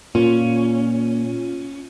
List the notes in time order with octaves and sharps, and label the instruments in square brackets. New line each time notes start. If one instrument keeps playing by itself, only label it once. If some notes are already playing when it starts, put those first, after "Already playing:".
[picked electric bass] A#2 [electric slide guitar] C#4 [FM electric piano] F4